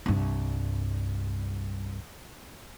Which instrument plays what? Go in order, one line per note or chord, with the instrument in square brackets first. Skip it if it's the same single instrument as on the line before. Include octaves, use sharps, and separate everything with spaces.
[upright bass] C2 G2